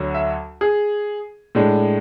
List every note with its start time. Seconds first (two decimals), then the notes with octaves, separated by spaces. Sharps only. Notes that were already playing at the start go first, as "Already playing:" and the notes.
Already playing: D2 D3 F#3
0.14 E5
0.61 G#4
1.55 A2 G#3 D4